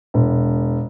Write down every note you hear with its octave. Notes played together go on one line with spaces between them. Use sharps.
E1